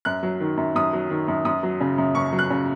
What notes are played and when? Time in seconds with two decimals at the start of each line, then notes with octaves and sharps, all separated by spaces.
0.05 F#2 F#6
0.23 F#3
0.40 D#3
0.57 F#2
0.75 F#2 D#6
0.93 F#3
1.10 D#3
1.28 F#2
1.45 F#2 D#6
1.63 F#3
1.80 C#3
1.98 F#2
2.15 F#2 C#6
2.33 F#3
2.39 F#6
2.50 C#3